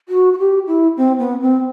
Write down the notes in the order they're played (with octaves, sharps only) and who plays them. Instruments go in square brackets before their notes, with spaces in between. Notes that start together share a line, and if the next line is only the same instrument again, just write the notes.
[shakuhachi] F#4
F#4
G4
E4
C4
B3
C4